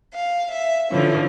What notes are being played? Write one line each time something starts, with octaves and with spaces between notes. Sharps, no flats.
F5
E5
D3 E3 F3 C#4